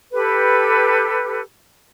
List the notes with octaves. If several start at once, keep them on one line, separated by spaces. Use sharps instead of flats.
G4 A4 B4